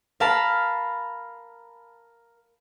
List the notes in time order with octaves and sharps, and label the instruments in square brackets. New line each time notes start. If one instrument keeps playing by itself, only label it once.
[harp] A#4 F5 A5 B5